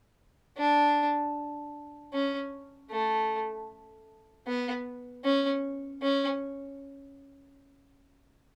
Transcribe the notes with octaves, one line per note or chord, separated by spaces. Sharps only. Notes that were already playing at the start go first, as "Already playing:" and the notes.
D4
C#4
A3
B3
C#4
C#4